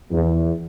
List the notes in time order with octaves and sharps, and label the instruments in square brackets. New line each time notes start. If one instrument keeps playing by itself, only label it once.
[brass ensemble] E2